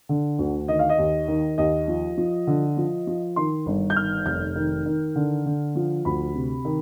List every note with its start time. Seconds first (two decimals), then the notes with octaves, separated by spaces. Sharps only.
0.09 D3
0.39 D2
0.68 D#3 D#5
0.79 F5
0.89 D#5
0.98 D#2
1.28 D#3
1.58 D#2 D#5
1.88 F3
2.17 F3
2.47 D3
2.77 F3
3.07 F3
3.36 D#3 C6
3.66 G1
3.90 G6
3.96 D#3 F6
4.26 F1 G6
4.56 D#3
4.86 D#3
5.16 D3
5.46 D3
5.75 F3
6.05 D2 B5
6.35 C3
6.65 D#3